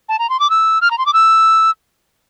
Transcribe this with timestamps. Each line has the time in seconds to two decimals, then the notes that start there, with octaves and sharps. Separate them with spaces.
0.09 A5
0.19 A#5
0.30 C6
0.40 D6
0.50 E6
0.81 F6
0.91 A#5
0.98 C6
1.06 D6
1.13 E6